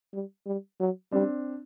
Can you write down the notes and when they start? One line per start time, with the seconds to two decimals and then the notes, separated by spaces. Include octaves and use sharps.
0.13 G3
0.46 G3
0.80 F#3
1.12 G3 C4 D4